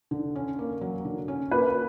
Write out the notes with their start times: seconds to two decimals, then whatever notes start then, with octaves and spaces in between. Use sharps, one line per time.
0.11 D3
0.35 C#4
0.59 A#3
0.81 F#3
1.05 D3
1.28 C#4
1.51 A#3 B4